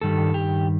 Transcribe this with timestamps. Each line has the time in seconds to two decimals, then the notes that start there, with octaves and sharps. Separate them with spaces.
0.01 G2 D#3 G3 A4
0.34 G4